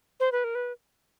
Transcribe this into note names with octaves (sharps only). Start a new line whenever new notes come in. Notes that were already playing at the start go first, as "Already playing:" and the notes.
C5
B4
A#4
B4